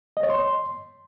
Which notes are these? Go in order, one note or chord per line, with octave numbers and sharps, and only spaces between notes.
D#5
C#5
C6